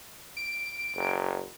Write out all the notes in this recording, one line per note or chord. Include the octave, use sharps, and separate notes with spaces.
D7
F#1